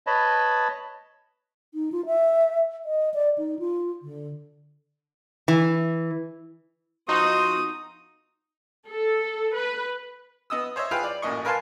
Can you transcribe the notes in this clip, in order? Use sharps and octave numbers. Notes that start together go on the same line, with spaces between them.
B4 C#5 D#5 A5 B5
D#4
F4
E5
D#5
D5
D#4
F4
D3
E3
F3 D#4 F#4 C6 D#6
A4
B4
B3 D#5 D#6 E6
C5 C#5 D#5 E5
F4 G#4 B4 F5 G5
D5
A1 F#2 A#2 D#5 C#6
A#4 B4 F5 G#5 A5 C6